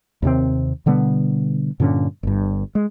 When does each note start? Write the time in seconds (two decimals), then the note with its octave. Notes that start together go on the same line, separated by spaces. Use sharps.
0.22 D#2 C3 C4
0.86 B2 D3 G3 B3
1.80 G2 A#2 D3 C#4
2.23 G1 G2
2.75 G#3